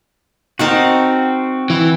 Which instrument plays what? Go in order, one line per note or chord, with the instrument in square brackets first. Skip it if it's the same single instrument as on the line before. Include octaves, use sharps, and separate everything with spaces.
[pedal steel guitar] C4 F#4 [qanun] D#4 A#4 A5
[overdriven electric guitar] E3